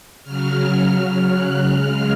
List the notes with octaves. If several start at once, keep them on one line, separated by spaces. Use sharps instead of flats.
C#3 F#3 F6
F#6
C#3 G#3 F6